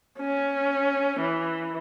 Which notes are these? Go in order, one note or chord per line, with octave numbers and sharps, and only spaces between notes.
C#4
E3